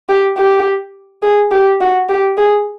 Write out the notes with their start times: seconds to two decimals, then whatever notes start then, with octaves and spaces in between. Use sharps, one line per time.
0.09 G4
0.38 G4
1.23 G#4
1.52 G4
1.81 F#4
2.09 G4
2.38 G#4